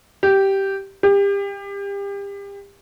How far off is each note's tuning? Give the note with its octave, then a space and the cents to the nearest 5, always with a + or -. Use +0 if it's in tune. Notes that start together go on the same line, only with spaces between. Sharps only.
G4 -10
G4 +30